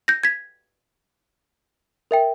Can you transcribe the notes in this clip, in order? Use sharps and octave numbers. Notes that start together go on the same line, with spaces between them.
G6 A#6
G#6 B6
A#4 E5 G5